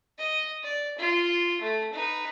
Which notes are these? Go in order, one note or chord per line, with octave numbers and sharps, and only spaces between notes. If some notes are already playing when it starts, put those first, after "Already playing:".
D#5
D5
F4
A3
D#4 B4